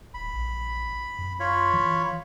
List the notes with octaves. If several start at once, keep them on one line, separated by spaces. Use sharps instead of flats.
D1 B5
A#1
F#2
F4 C#5 B5
E3